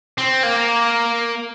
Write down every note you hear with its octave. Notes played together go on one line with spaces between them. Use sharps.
C4
A#3